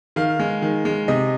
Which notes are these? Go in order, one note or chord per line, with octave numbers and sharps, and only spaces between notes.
D#3 F5
G#3
D#3
G#3
C3 D#5